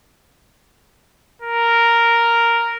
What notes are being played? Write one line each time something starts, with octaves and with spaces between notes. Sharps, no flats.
A#4